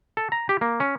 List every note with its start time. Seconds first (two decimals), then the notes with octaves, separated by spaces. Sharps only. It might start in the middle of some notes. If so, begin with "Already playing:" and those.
0.17 A4
0.32 A#5
0.49 G4
0.61 A#3
0.80 C#4